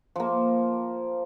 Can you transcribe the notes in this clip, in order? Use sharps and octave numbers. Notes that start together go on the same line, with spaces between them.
F3 A#3